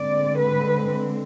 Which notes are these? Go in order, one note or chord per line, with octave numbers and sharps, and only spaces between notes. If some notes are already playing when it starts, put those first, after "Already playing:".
Already playing: D3 G#3 C4 D5
B4